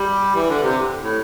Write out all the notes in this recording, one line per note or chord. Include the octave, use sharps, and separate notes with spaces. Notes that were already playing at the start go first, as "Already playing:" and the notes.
Already playing: G3
E3
D3
C3
A2